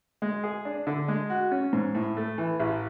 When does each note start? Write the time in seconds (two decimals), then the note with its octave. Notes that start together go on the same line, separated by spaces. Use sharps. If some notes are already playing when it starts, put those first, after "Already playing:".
0.22 G#3
0.43 G#4
0.65 D4
0.87 D3
1.08 G#3
1.30 F#4
1.52 C#4
1.73 G#2
1.95 A2
2.17 A3
2.38 E3
2.60 A1